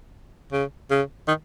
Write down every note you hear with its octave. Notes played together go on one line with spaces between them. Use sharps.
C#3
C#3
D#3